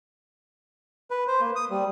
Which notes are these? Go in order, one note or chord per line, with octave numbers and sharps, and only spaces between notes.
B4
C5
A#3
D#6
G3